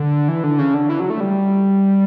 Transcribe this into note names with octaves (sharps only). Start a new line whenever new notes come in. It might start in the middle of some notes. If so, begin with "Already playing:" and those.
Already playing: D3
E3
D3
C#3
D3
E3
F#3
A3
G3